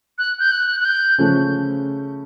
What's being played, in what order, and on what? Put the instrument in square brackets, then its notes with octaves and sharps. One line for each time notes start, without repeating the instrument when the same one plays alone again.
[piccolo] F#6
G6
F#6
F#6
G6
[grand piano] C#3 F3 A3 C#4